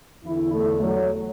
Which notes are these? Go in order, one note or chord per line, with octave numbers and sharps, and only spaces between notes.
E2 D3 E4
A3
F#3